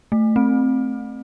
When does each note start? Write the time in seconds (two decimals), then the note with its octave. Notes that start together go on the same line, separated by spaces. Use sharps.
0.12 A3
0.36 C4